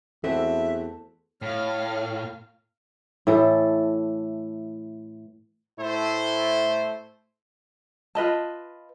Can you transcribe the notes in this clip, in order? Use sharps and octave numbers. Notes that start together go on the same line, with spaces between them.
E2 E3 C4 F#4 A4 E5
A2 C#5 F5 F6
A2 E3 A4
A2 A3 E4 A4 C5
F4 B4 D#5 A5